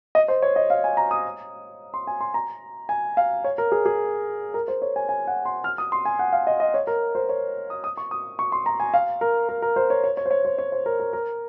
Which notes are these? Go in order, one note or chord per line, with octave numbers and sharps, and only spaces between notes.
D#5
C5
C#5
D#5
F5
G#5
A#5
D#6
C6
G#5
C6
A#5
G#5
F5
C#5
A#4
G#4
G#4
A#4
C5
C#5
G#5
G#5
F#5
C6
F6
D#6
C6
G#5
F#5
F5
D#5
D#5
C#5
A#4
C5
C#5
D#6
D#6
C#6
D#6
C#6
C6
A#5
G#5
F5
A#4
A#4
A#4
C5
C#5
C#5
C#5
C5
C#5
C5
C#5
C5
A#4
A#4
A#4